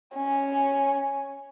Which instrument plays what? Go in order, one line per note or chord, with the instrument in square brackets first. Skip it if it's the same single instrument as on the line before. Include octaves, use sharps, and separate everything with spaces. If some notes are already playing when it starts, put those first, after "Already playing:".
[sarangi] C#4